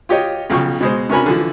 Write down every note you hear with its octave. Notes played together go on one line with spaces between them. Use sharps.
F4 G4 C#5 D#5
B1 C#3 F3 G5 C#6
B2 G#3 C5
C3 C#4 D4 A#4 G#5 B5
D3 E3 F3